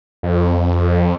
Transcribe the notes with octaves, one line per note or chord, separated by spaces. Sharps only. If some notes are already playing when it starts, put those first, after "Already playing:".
F2